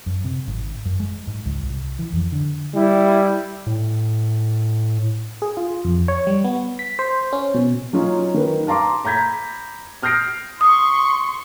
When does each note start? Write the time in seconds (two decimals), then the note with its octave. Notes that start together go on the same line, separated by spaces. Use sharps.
0.06 F#2
0.24 C3
0.48 G#1
0.85 F#2
1.00 G#3
1.27 G#2
1.46 C#2
1.63 C2
1.99 E3
2.13 F2
2.32 D3
2.74 G3 E4
3.66 A2
5.42 G#4
5.57 F4
5.85 F2
6.08 C#5
6.27 G3
6.44 B3
6.79 B6
6.99 C5
7.33 C#4
7.54 B2
7.93 F#3 C#4 D#4 F4 C#5
8.34 D#3 B4
8.67 F5 A5 A#5 C6 D6
9.05 A#5 B5 G6 G#6 B6
10.03 D#6 F6 G6 A#6 C7 D7
10.61 C6 C#6 D#6